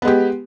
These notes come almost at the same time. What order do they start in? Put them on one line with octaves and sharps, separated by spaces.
B3 G#3 G4